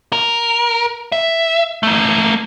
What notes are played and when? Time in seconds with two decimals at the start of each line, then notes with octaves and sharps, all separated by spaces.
0.13 A#4
1.12 E5
1.83 A3 A#3